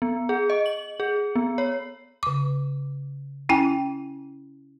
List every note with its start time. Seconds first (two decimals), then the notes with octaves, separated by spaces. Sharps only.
0.02 B3
0.29 G#4
0.50 D#5
0.66 F#7
1.00 G#4
1.36 B3
1.58 C#5
2.23 C#3 D6
3.49 C#4 E4 G5 G#5